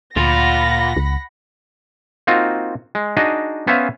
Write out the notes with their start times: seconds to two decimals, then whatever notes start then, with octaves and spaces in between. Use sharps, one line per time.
0.16 D2 A#2 F4 F#5 B5 A#6
0.96 C#2
2.27 A#3 C4 D#4 F4 F#4
2.95 G#3
3.17 D4 D#4 F#4 G#4 D#5
3.67 B3 C#4 C5 E5 F5 G#5